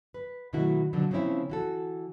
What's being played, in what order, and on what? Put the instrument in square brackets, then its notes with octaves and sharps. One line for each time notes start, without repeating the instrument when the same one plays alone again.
[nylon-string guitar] B4
B2 D#3 F#3 A3 E4 F#4
B2 D3 F3 F#3
C#3 F3 A#3 C4 C#4 E4
E3 F#4 A4